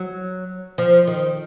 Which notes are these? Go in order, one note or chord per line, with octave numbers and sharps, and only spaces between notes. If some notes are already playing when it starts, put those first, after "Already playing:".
Already playing: F#3
F3
D#3